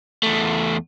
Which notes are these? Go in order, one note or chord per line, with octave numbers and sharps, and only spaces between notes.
E2 A3